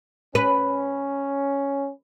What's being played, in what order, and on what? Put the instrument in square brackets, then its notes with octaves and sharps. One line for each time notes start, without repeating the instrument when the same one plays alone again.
[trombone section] C#4 [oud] B4